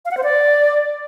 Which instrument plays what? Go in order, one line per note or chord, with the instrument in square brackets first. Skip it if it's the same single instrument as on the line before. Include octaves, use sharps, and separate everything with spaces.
[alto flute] F5
F#5
C5
D5